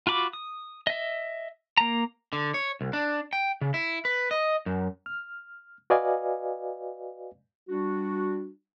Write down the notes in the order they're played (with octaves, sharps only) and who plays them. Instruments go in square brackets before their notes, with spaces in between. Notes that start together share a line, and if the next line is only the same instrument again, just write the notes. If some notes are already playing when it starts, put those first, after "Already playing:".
[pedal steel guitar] F4 F#4 B5 D6
D#6
D#5 E5
A#3 A#5
[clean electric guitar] D3
C#5
C2
D4
G5
C#3
E4
B4
D#5
F#2
[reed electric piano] F6
F#4 B4 D5 D#5 F5 G#5
[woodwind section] G3 D4 F#4